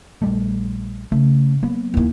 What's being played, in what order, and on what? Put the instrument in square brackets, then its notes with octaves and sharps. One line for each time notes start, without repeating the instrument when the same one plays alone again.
[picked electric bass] A#1 G3 A3
[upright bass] C#3 [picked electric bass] A3
[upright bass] F#3 [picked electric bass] A#3 B3
[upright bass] D#2 E3